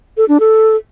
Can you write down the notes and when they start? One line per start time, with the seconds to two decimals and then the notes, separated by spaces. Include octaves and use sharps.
0.17 A4
0.28 D4
0.40 A4